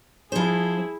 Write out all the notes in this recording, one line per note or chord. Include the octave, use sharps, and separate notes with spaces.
F3 E4 G#4 C5